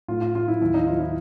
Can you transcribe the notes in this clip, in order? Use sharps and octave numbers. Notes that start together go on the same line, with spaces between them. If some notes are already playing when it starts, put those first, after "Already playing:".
A2 F4
F4
A3 F4
E4
D#2 E4
D#4
F3 F4
E4